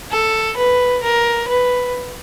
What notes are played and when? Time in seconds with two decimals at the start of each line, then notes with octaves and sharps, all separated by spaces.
0.11 A4
0.57 B4
1.03 A#4
1.48 B4